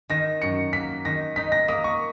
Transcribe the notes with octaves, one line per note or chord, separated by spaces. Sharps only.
D#3 A#6
F#2 C#7
A#3 B6
D#3 A#6
D#4 B6
A#6
A#3 D#6
C#6